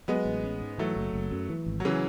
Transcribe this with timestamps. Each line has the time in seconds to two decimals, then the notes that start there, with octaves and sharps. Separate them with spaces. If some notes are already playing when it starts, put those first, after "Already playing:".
0.08 F#3 G#3 B3
0.25 A1
0.44 C#4
0.61 G#2
0.78 E3 F#3 A3
0.96 F#1
1.13 F#1
1.31 F#2
1.49 E3
1.66 G#1
1.80 F#3
1.85 C#3 E3